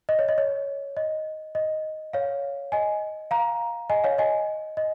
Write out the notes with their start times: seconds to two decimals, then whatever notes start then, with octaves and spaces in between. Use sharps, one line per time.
0.09 D#5
0.19 C#5
0.29 D#5
0.38 C#5
0.97 D#5
1.55 D#5
2.13 C#5 F5
2.72 D#5 G#5
3.31 F5 A#5
3.90 D#5 G#5
4.04 C#5 F5
4.18 D#5 G#5
4.77 D#5